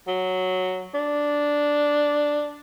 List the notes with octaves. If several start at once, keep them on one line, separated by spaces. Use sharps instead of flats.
F#3
D4